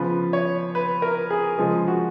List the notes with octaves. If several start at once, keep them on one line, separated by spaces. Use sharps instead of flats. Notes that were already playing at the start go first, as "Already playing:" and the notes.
Already playing: C#3 F3 B3 B4
C#5
B4
A#4
G#4
C#3 F3 G#3 G#4
F#4